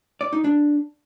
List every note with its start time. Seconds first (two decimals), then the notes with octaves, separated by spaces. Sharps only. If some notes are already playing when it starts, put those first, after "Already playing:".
0.21 D5
0.33 D#4
0.44 D4